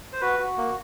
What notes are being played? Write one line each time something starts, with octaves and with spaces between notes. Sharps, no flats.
C5
F#4 B4
F#4
A#3